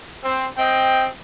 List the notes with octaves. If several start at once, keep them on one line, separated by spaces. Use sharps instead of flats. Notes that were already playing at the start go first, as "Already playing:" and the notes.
C4
C4 D#5 G5